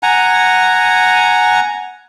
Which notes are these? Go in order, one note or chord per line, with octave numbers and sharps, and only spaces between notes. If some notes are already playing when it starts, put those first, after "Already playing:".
F#5 G#5 A#5